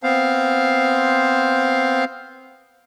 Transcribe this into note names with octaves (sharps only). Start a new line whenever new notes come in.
B3 C4 C5 F5